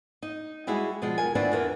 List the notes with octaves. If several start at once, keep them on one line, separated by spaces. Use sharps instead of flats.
D#4
G3 G#3 E4 F#4 G#4
B2 F3 G3 G#3
D#2 A#4 G#5
D#3 B3 C4 D4 E4 F4
E2 E3 A#4